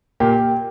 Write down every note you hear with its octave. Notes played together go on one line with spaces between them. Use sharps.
A#2 A#3 G4